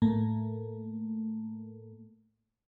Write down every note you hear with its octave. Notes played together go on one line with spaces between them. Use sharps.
A2 A3 A#3